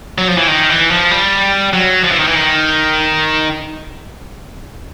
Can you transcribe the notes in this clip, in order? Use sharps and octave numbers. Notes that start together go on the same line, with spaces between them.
F#3
F3
E3
D#3
E3
F3
G3
F#3
F3
E3
D#3
E3
D#3